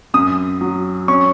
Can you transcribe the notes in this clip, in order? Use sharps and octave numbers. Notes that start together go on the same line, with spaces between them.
F#2 D#6
F#3
C#4 C#6